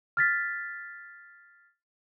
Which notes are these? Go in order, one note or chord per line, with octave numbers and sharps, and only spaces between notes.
F6 A6 B6